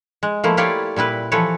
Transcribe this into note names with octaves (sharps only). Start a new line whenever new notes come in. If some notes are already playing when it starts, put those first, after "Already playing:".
G#3
F3 A3 A#3 E4
E4 F4 G4 C#5 D5
A#2 G3 E4 B4
E3 F3 A4 B4 C#5